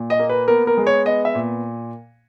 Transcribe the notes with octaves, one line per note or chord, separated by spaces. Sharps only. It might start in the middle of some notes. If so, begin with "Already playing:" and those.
Already playing: A#2
D#5
A#3
B4
B3 A#4
A#4
G#3
C#5
B3 D#5
E5
A#2